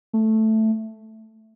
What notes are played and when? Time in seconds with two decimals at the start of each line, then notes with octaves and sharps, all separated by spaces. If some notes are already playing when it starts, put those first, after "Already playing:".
0.13 A3